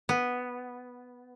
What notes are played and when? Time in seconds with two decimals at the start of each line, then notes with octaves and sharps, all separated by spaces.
0.09 B3